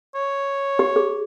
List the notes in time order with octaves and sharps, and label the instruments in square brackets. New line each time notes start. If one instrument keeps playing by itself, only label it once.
[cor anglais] C#5
[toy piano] G4
G#4